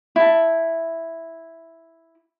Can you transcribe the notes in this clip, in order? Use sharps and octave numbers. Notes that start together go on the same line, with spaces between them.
E4 A5